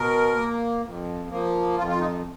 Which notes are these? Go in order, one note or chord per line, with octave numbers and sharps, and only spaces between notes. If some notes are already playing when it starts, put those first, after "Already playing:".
Already playing: B2 A#4
A#3
F2
F3 A#3
F2 F4
F4
D#4